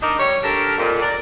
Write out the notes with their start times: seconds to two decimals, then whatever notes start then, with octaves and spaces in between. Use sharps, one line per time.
0.01 D4 D#4 A#4 D5 D#5
0.19 G3 C#5
0.43 D4 G4 A4 A#4
0.78 F2 A#2
1.01 A#4 D5